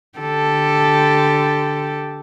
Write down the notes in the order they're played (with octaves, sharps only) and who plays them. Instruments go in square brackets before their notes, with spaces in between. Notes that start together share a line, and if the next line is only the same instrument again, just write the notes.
[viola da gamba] D3 G4 A4